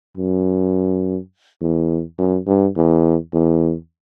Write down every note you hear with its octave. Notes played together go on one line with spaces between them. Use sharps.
F#2
E2
F#2
G2
E2
E2